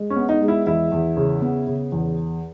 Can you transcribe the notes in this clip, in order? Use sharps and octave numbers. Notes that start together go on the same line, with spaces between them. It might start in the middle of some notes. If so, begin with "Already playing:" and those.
Already playing: G#3
C#4
B3
D#4
G#3
E4
E2 E4
E2
C#3
B3
C#3
E2